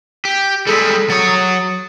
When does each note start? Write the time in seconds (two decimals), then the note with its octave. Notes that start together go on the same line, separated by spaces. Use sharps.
0.25 G4
0.67 G3 G#3 G#4 A4 B6
1.10 F#3 C#5 D#6 A6